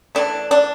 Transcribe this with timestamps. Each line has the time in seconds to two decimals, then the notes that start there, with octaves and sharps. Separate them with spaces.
0.15 E3 A3 D4
0.51 D4